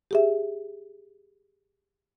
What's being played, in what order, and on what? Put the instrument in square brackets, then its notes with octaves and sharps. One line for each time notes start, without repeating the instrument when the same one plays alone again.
[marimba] G4 G#4 E5